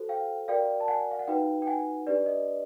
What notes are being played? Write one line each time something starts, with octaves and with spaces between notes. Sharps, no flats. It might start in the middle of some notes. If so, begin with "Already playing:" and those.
Already playing: F#4 A4 C5
F5 G5
F#4 A#4 D5 F5 G5
A5
F#5 G#5
F5
F#5
D#4 F#4 B4 F5 G5
G5
F#5 G#5
D4 G4 B4 D5
D#5